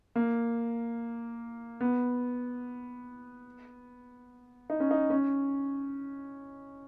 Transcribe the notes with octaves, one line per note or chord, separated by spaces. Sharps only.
A#3
B3
D#4
C#4
D#4
C#4